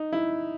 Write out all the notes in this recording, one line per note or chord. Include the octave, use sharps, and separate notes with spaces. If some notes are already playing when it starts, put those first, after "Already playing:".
Already playing: D#4
E4